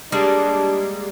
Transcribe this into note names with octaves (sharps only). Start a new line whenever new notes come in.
G3 G#3 A#3 D4